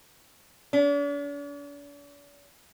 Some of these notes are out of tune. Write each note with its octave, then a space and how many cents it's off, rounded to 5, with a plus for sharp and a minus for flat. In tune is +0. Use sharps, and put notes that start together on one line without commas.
D4 -45